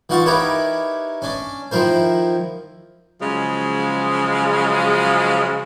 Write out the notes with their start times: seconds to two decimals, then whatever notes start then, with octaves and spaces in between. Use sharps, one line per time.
0.09 E3 D#4 F4 F#5 A5 C#6
0.26 D#4 E4 G4 A#4 B4 C#5
1.22 C#4 D4
1.71 D#3 F3 E4 A#4 C5
3.21 C#3 F3 F#3 G#3